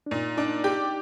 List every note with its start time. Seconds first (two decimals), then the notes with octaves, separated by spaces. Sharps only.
0.06 D4
0.11 A#2 D#4
0.38 D4 D#4
0.64 G4